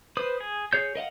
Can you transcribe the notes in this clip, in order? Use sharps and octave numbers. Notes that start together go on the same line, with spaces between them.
B4 C5 D#6
G#4
G#4 C#5 G6
A#4 D#5 F5 F#5